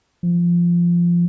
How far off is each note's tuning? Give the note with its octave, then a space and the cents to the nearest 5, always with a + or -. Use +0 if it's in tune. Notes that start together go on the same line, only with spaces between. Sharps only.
F3 -15